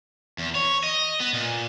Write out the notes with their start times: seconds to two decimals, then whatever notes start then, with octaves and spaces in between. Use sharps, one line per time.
0.38 E2
0.55 C#5
0.84 D#5
1.20 B3
1.33 A#2